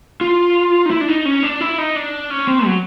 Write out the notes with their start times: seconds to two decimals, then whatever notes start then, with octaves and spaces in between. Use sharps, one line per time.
0.21 F4
0.86 D#4
0.91 E4
1.01 D4
1.08 D#4
1.25 C#4
1.43 D4
1.61 E4
1.78 D#4
1.96 D4
2.30 C#4
2.48 C4
2.66 F#3